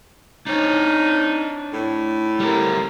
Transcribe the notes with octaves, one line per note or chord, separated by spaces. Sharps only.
D4 D#4 C#5
A2
G3 A#4